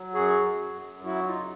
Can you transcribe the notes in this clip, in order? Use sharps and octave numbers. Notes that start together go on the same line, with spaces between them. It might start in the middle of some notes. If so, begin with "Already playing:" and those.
Already playing: F#3
F#2 F#4 G#4
F#3
F#2
F#3 E4 F#4
D#4 F4
C#3